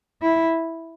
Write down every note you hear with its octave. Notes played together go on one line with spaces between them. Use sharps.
E4